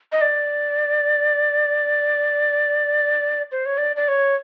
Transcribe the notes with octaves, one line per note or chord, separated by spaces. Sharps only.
D#5
D5
C5
C#5
D5
D5
C#5